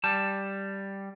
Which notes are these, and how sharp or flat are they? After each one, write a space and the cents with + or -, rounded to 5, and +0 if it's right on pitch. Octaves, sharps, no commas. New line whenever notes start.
G3 +0 A5 +5